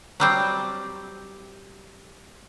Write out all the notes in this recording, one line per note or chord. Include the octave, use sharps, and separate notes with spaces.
F#3 G3 C4